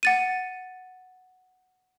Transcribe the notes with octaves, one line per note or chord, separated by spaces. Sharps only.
F#5 A6 D#7